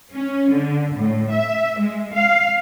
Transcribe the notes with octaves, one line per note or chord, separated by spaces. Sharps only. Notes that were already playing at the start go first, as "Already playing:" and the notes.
C#4
D3
A2
E5
G#3
F5